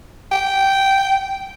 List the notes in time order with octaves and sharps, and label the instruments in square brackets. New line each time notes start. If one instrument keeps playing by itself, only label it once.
[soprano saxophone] G5